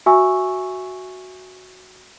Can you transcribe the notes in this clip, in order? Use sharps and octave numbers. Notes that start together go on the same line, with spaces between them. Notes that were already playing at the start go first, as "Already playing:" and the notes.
F#4 E5 G#5 C#6 E6